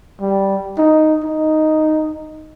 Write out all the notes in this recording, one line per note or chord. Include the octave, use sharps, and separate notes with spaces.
G3
D#4
D#4